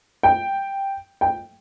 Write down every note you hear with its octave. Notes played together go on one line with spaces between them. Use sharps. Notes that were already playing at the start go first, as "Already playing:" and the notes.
G5
G5